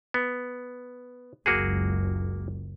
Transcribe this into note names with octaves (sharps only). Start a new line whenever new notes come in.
B3
F#1 C#2 A#3 F#4 G#4